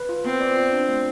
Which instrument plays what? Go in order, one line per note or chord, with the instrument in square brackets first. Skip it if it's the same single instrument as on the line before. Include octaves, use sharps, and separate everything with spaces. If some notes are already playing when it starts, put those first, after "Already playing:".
Already playing: [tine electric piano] B4
F4
[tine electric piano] B3 [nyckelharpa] C4
[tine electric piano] D5
F4
D4
A3